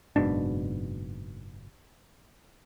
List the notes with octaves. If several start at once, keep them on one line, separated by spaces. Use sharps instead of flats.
F#1 G#2 B2 D4